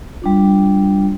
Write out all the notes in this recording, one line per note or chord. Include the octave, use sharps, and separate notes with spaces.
G3 D4 F4